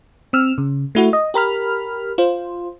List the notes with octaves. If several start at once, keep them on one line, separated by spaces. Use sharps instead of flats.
C4 E6 F6
C#3
A3 E4 F#4
D#5
G4 A#4 B5 F6
F4 C5